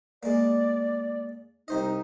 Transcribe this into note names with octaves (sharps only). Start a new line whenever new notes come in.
G#3 A#3 D5
C2 D#4 C5 D#5